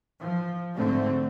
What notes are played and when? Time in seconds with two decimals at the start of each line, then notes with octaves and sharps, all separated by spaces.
0.21 F3
0.75 G#2 D3 A3 C4